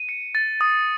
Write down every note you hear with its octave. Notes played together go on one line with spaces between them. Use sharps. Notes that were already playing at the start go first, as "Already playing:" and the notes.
Already playing: D#7
C#7
A6
D#6